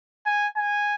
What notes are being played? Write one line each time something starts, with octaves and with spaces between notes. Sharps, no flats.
G#5
G#5